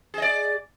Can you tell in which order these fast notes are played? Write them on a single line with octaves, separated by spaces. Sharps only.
G#4 D#5 D5